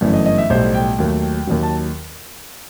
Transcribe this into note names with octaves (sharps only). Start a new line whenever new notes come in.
G1 F#2 E3 A3
D#5
D#5
E5
B1 A2 G3 C5
G5
D#2 D#3 F#3 A3
D#2 D#3 F#3
A5